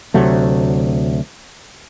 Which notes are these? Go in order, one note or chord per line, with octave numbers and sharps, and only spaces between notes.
D2 C3 F#3 A3